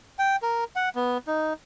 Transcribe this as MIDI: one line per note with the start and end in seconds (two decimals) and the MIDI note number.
0.19 0.36 79
0.42 0.64 70
0.76 0.89 78
0.95 1.18 59
1.27 1.53 63